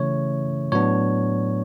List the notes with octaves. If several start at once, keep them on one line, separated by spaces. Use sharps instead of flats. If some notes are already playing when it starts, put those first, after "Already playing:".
Already playing: C#3 E3 A3 C#4 E4 C#5
A2 F#3 B3 D4 C#5